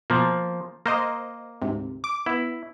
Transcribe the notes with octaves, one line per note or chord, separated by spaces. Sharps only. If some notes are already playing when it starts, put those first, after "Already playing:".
B2 F3 A#3
A#3 A#4 C5 D#5
D2 G#2 C3
D6
B3 E4